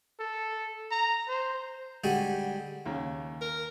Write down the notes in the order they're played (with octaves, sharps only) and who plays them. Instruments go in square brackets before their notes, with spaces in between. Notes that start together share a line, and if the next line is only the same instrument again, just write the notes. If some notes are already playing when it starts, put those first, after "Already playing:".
[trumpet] A4
A#5
C5
[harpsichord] D3 G3 G#3 F#4
[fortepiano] D#2 C#3
[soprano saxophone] A#4